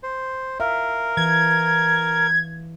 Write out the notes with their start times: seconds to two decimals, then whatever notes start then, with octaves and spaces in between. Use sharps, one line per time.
0.03 C5
0.60 A#4 E5 F5
1.17 E3 G#6